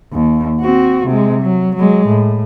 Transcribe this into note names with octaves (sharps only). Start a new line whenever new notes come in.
D#2
C4 F#4
C3 G#3
F#3
F#3 G#3
A2